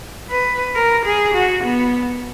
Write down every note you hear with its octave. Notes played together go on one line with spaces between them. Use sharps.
B4
A#4
G#4
F#4
B3